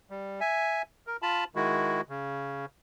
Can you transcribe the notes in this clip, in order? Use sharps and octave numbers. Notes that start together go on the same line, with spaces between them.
G3
E5 G#5
A#4
F4 A5 B5
D#3 G#3 E4 F#4
C#3